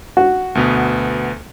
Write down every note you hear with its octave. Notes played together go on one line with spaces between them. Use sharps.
F#4
D2 B2 B3